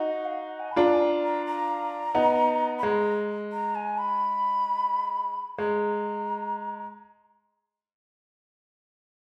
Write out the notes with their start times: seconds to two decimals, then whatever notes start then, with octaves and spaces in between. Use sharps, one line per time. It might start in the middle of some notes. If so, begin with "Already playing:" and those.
Already playing: D#4 F#4
0.08 F#5
0.25 F5
0.43 F#5
0.60 G#5
0.72 B5
0.76 D4 F4 A#5
0.94 G#5
1.00 A#5
1.23 A#5
1.46 A#5
2.15 B3 D#4
2.78 B5
2.83 G#3 A#5
3.52 A#5
3.75 G#5
3.98 B5
5.59 G#3 A#5